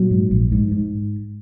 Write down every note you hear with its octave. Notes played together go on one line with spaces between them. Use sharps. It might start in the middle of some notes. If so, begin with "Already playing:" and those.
Already playing: A#2 F#3
G#2
A#1
G#2
G#2